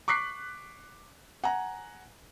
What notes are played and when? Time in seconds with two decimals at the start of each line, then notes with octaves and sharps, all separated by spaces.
0.08 C#6 D6 F#6 B6 C7
1.44 F#5 G#5 A#5